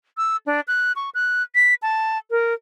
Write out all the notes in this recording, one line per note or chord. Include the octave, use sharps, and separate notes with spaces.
E6
D4
F#6
C#6
F#6
B6
A5
A#4